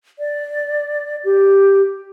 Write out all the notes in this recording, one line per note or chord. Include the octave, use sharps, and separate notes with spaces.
D5
G4